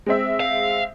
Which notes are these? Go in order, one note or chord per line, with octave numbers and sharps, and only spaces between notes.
G#3 C4 E5
F5